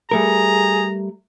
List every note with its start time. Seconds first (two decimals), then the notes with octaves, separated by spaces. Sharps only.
0.11 G3 A3 G#4 A#4 A#5